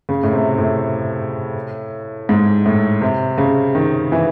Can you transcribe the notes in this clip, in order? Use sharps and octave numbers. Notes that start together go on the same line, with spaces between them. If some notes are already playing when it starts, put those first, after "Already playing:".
C#3
A2
C3
A2
G#2
A2
C3
C#3
D#3
E3